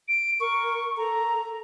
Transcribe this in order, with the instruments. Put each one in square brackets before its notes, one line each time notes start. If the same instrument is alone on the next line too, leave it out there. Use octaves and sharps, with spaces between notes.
[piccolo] D7
[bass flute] A#4 [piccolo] C#6
[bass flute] A4 [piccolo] A#5